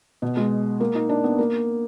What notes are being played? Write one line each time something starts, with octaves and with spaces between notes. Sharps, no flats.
B2
G#3
A#3
D#4
D4
B3
A#3